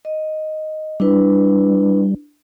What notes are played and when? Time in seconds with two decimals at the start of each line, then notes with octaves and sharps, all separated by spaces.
0.05 D#5
1.00 G3 D4 E4 B4